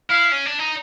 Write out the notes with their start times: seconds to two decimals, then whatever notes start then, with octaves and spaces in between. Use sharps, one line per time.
0.10 E4 F5
0.32 C#4
0.46 D4
0.60 D#4